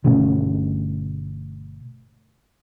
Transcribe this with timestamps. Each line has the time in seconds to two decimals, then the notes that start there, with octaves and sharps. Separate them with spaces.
0.04 G1 B2 A3 C#4